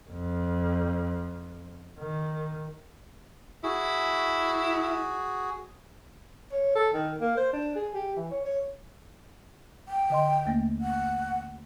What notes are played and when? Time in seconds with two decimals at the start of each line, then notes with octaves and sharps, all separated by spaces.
0.10 F2
1.99 D#3
3.64 E4 F#4 G#4
6.52 C#5
6.75 A4
6.94 D#3
7.21 A#3
7.37 C5
7.53 D4
7.76 G#4
7.94 G4
8.16 E3
8.31 C#5
8.45 C#5
9.88 G5
10.10 D3 D#5 C6
10.45 D#2 A3 A#3
10.81 F#5